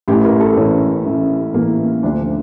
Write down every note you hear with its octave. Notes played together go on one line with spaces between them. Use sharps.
A1 A2 E3 G4
A#4
A4
A1 A2 E3 C#4
A1 A2 E3
A1 A2 E3 A#3
D2 D3 F3 D4